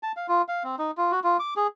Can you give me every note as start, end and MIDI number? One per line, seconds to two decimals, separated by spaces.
0.03 0.12 81
0.16 0.26 77
0.28 0.42 65
0.48 0.63 77
0.64 0.76 60
0.79 0.91 63
0.97 1.11 65
1.12 1.20 66
1.24 1.37 65
1.39 1.54 86
1.57 1.67 68